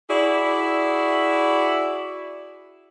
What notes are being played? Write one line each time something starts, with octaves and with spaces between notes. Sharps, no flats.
E4 F#4 G#4 D5